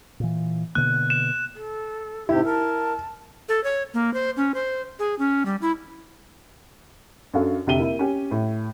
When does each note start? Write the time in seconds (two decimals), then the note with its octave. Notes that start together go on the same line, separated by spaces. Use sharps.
0.20 A#2 E3
0.75 B2 D3 A#3 F#6
1.10 E7
1.53 A4
2.29 G#2 C3 E4 G4
2.45 A#4 A5
3.49 A4
3.64 C#5
3.94 A#3
4.14 C5
4.37 C#4
4.54 C5
4.99 G#4
5.19 C#4
5.46 G3
5.62 E4
7.34 F#2 D4 F#4 A4 F5
7.67 F1 D3 G4 E5 D#7 G7
7.79 A#3 E4
7.99 C#4 G4
8.31 A2